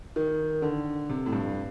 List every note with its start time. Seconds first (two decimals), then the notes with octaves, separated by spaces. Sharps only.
0.16 D#3
0.62 D3
1.09 C3
1.26 A2
1.32 G2